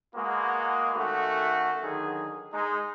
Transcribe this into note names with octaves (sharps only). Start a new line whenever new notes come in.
G#3 A#3 B3 F#4 G#4
D#3 A3 C#4 F#4
D3 D#3 F#3 G#4
G#3 D#4